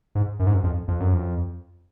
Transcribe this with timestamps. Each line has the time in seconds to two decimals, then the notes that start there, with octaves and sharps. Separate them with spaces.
0.15 G#2
0.39 F#2
0.47 G#2
0.54 F#2
0.64 F2
0.88 F2
1.01 F#2
1.14 F2